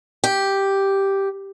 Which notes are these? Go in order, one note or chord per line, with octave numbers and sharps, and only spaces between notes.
G4